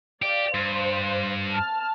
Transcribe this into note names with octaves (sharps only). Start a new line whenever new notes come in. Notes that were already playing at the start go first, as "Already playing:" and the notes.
G4 D5 F5
G2 C5 F5
A5 F6